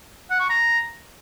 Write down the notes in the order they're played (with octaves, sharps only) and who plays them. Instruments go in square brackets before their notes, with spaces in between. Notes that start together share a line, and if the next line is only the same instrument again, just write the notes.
[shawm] F#5
C#6
A#5